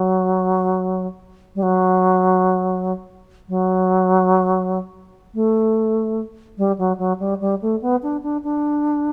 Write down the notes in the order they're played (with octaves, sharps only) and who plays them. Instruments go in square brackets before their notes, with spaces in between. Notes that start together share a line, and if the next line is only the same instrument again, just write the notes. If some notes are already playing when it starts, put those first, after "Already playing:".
Already playing: [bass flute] F#3
G3
F#3
F#3
A3
G3
F#3
F#3
G3
G3
A3
B3
D4
D4
D4